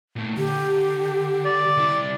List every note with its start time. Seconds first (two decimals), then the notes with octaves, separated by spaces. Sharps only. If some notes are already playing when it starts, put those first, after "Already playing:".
0.16 A#2 A3
0.37 D3 G4
1.45 D5
1.77 C2 E4